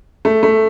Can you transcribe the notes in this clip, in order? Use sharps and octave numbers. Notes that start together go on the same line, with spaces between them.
A3
A3